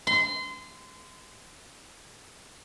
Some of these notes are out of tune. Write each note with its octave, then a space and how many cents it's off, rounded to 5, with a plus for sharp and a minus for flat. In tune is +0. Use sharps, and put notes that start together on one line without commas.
C6 -30